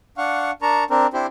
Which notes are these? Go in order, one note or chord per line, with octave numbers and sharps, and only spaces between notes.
D4 F5 F#5 C#6
D4 A#4 A5 A#5 C#6
C4 D4 A#4
C4 D4 E4 G4 C5